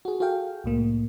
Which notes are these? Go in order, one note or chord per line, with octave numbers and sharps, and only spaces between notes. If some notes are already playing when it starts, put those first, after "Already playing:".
F#4 G#4
F#4 G#4 A4 F5 G5
C2 A2 A#3